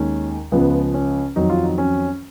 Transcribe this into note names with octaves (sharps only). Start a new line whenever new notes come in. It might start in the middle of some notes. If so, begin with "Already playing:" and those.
Already playing: D#2 D#3 G#3 C#4
C#2 C#3 F3 B3
C#4
F2 D#3 F#3 D#4
F4
D#4
C#4